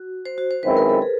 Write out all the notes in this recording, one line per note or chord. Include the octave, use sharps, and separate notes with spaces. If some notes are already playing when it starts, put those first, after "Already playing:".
Already playing: F#4
C5
F#4
C5
F#2 D#3 G#3 C4 E4 B4
A#4
A4
G#4